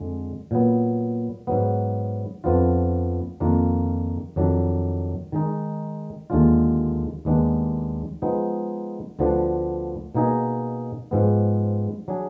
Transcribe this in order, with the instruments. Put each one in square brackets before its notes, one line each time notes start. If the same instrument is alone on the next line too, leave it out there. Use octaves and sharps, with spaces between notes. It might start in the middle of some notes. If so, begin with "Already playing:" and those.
Already playing: [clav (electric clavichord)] F2 D3 G#3
A#2 F#3 B3
G#2 F#3 B3
F2 F3 B3 D4 F4
F2 D#3 A#3 D4 F4
F2 D#3 F#3 D4
D#3 G#3 D#4
D#2 D3 G#3 D4 F4
D#2 D#3 G#3 B3 D4
F3 G#3 B3 D#4
D2 D3 F3 B3 D4
B2 A#3 D#4 G#4 D#5
G#2 F3 G#3 B3
F#3 D4 G#4